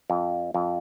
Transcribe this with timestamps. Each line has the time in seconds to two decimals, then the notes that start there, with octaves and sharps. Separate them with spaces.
0.10 F2
0.54 F2